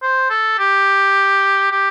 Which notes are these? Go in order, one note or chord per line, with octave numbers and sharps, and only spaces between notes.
C5
A4
G4
G4